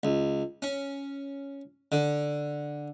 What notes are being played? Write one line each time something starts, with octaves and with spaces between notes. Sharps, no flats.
C#2
C#4
D3